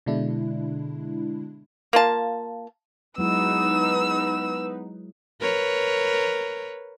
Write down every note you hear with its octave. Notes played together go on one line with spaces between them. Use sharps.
B2 D3 G#3 D4 E4
A#3 F4 A5
F#3 G#3 B3 D#4 E4 B4 E6
A#4 B4 C#5